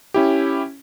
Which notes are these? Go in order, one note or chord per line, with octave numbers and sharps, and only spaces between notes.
C#4 E4 G4